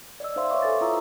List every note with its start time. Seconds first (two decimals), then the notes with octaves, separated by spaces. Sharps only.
0.20 D5 D#5 E6
0.36 D#4 C5 E5 F5 C6
0.50 B4 C#5 E5 F5 C#6 D6
0.62 A4 B4 G#5 A6
0.81 E4 F4 A#5 D#6 E6